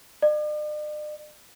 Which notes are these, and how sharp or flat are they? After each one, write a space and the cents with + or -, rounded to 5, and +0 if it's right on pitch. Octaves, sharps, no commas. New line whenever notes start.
D5 +45